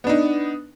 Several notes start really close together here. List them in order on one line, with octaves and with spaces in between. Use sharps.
B3 D4 D#4